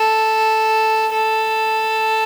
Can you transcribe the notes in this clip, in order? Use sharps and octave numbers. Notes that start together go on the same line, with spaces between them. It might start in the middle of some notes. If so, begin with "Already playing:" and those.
Already playing: A4
A4